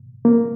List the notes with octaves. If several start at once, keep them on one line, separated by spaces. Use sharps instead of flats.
A#3